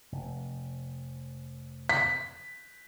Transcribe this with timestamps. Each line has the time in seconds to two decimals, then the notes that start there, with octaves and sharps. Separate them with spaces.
0.12 F1
1.89 B6